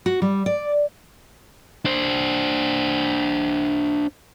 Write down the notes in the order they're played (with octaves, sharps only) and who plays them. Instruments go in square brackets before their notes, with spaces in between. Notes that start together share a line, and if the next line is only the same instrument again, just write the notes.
[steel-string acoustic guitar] F#4
G3
D5
[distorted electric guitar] D4 C5